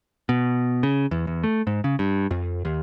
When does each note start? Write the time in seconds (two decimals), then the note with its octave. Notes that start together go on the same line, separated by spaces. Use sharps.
0.29 B2
0.83 C#3
1.11 E2
1.27 E2
1.44 A3
1.67 G#2
1.84 C#3
1.99 G2
2.31 F2
2.65 D#2